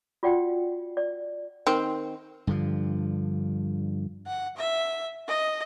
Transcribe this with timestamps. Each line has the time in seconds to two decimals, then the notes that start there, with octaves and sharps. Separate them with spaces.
0.23 F4 F#4 D5 F#5 G5
0.97 D5
1.67 D#3 C4
2.47 G2 D3 F3
4.27 F#5
4.57 E5
5.27 D#5